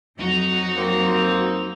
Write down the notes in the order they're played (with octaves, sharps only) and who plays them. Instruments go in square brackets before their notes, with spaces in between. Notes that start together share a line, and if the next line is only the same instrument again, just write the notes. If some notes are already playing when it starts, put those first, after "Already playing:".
[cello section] F2 F#3 F#4 [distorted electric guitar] D#4
[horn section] A#3 C4